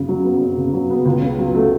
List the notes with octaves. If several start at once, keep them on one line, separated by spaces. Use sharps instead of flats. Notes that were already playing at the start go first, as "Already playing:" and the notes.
Already playing: F#2 C#3
F#3
B3
F#2
C#3
F#3
B3
C#2
C#3
F#3
A3